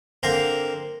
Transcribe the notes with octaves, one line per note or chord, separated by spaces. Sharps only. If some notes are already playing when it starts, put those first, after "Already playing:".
D3 A#3 C4 A#4 C5